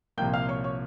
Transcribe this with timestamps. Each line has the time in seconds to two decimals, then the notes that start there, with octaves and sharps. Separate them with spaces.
0.18 C2 A#2 F3 A#3 G5 G6
0.34 F5 F6
0.49 C#5 C#6
0.64 C#5 C#6